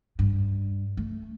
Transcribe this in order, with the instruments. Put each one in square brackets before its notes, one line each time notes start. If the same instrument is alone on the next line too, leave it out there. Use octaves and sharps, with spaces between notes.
[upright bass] G2
A3